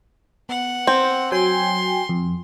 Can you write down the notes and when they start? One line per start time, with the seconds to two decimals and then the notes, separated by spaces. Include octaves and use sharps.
0.49 B3 F#5
0.87 C4
1.32 F#3 G5 G#5 C6
2.09 F2